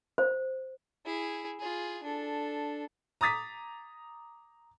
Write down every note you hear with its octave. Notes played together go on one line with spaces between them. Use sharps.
C5
E4 G#4
F4 G#4
D4 A4
A#5 D6 D#6 A6 B6